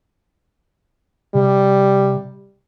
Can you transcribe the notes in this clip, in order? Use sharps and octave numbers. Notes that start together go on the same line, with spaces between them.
C3 G3